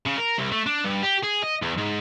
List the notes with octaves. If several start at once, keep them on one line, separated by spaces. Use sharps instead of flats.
C#3
A#4
C2
A3
D4
G2
G4
G#4
D#5
E2
G#2